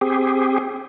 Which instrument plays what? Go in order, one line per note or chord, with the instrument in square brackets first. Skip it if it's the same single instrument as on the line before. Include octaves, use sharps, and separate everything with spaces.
[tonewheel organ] C4 G4 G#4